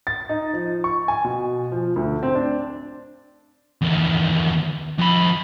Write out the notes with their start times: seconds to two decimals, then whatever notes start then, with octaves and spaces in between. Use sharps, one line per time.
0.07 A6
0.29 D#4
0.53 F3
0.84 C#6
1.08 G#5
1.24 B2
1.72 F3
1.96 D2
2.23 C4
2.35 D4
3.81 E2 D#3
4.98 F2 B5